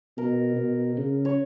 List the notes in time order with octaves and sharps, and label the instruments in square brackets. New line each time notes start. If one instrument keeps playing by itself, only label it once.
[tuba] B2 [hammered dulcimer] A#4
[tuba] B2
C#3
[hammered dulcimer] C#5